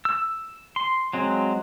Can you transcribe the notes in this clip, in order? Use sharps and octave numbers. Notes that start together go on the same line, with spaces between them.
E6
C6
F#3 G#3 C4